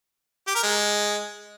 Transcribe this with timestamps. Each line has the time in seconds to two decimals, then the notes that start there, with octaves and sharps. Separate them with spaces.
0.47 G4
0.55 A#4
0.63 G#3